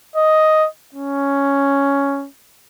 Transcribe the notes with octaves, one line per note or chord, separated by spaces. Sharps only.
D#5
C#4